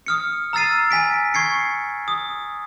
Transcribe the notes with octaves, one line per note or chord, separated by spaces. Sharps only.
D#6 F6 C#7
A#5 E6 F6 A6 C7 D#7
G#5 B6 D7
C#6 G#6 C7 C#7
D#6